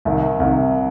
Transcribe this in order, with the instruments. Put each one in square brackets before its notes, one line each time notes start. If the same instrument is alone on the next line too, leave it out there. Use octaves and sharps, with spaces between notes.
[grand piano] C2 C3 D#3
C2 C3 D#3